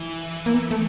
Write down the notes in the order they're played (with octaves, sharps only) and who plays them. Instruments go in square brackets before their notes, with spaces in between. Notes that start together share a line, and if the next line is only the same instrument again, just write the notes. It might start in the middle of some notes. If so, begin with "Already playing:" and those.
Already playing: [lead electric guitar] E3
[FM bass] A#3
B3
A3